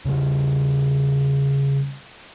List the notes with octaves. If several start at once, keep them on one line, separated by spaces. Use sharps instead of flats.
C#3 G3